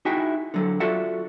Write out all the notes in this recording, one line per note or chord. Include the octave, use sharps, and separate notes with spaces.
D#4 E4 F#4 G#4 E5 G5
D3 F#3 A4
F4 F#4 A4 D5 E5 F#5